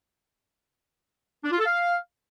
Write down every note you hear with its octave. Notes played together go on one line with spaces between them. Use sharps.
D4
F4
A4
F5